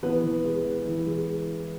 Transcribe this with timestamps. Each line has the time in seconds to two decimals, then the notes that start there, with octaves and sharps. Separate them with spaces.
0.03 E3 B3 B4
0.24 E3
0.44 G#3
0.65 G#3
0.85 E3
1.06 G#3